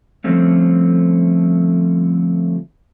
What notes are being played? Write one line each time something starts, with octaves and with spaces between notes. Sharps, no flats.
D3 F3 G3 A3 C4 C#4